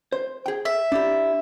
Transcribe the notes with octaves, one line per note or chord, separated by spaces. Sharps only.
C5
G#4 G5
E5
D4 E4 G4